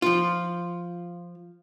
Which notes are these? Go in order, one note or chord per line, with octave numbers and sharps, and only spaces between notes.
F3 F4